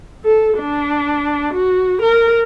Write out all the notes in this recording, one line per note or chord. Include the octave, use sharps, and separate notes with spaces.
A4
D4
F#4
A#4